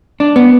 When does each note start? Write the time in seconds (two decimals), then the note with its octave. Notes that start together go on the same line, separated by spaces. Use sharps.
0.20 D4
0.36 B3